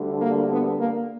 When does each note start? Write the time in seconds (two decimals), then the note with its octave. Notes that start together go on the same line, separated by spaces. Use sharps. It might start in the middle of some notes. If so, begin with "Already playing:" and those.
Already playing: D2 D3 G3
0.21 A#3
0.51 B3
0.79 A#3